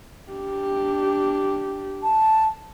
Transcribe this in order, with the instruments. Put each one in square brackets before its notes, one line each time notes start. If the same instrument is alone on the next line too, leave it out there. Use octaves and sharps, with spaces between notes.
[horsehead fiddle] D4 G4
[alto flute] A5